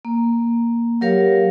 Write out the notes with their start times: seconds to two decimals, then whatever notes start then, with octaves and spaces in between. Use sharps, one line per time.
0.05 A#3
1.01 F#3 G4 A#4 C#5 F5